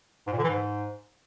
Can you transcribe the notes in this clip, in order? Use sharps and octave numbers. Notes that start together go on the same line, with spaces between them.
G#2
A#2
D3
E3
G#2